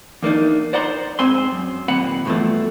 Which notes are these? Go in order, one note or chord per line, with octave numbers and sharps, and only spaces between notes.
E2 A#3 D4 D#4
C5 D5 F#5 A#5 C6
G#2 C4 G#5 C6
F#2
D#2 A#2 C4 F#5 B5
E2 G2 B2 F3 A3